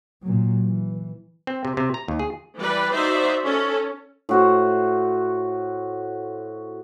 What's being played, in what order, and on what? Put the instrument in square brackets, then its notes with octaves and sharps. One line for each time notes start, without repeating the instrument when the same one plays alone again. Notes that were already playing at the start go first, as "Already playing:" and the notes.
[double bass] A#2 F#3
E3
[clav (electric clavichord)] C4
C3
C3
A#5
D#2
G#4
[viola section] E3 G3 B4 D5
D#4 F#4 C5 D5 E5
C#4 A4
[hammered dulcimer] A2 F#4 C5